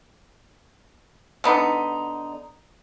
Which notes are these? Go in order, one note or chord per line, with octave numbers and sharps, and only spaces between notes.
D3 B3 D#4